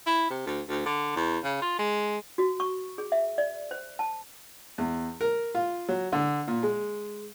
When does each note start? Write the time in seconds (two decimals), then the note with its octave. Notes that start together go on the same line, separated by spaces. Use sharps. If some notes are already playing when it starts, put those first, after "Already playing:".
0.06 E4
0.30 C3
0.46 D2
0.69 D2
0.86 D3
1.16 E2
1.44 C#3
1.62 F4
1.79 G#3
2.38 F#4
2.60 C#6
2.98 G#4
3.12 E5
3.38 D5
3.71 C5
3.99 A5
4.78 E2
5.21 A#4
5.55 F4
5.89 F#3
6.12 D3
6.48 A#2
6.63 G#3